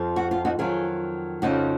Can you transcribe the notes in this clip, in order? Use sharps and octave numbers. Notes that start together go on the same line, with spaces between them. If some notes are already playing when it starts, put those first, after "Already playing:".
Already playing: F2 F3
F#4
F4
D#4 F#4
F2 D#3 F#3 F4 G#4
F2 C#3 F3 D#4 F#4